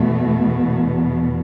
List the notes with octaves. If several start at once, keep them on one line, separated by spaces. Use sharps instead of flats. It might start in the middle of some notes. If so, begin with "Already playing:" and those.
Already playing: E2 B2 A3